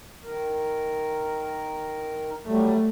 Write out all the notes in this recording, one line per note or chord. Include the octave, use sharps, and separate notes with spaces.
D#3 A#4
F#3 G3 A3